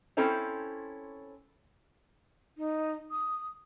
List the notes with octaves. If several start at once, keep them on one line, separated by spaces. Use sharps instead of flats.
C4 C#4 E4 A4 C5 C#5
D#4
D#6